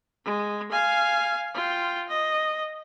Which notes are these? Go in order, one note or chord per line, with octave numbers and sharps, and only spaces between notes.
G#3
F5 G#5
F4 G5
D#5